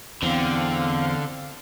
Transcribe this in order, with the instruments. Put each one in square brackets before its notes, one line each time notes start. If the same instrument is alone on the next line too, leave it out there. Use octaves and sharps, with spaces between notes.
[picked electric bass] E2 [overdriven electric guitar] D3 [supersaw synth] C4 F5